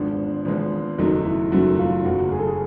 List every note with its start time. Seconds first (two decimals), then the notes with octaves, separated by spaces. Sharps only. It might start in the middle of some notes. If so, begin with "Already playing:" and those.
Already playing: G#1 G#2 F3 G#3 B3 D4
0.45 G#1 G#2 F3 G#3 B3
0.98 F#1 F#2 D#3 F#3 A3 D#4
1.25 E4
1.52 F#1 F#2 D#3 F#3 A3
1.79 F4
2.04 F#1 F#2 C#3 F#4
2.32 G#4
2.39 A4
2.47 G#4